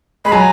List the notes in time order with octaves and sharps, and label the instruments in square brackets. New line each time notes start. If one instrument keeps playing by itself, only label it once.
[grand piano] G#3 [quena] B5
[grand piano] F#3 [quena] G#5